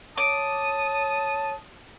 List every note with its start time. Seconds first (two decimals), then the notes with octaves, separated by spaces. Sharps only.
0.18 C#5 A5 D6 D#6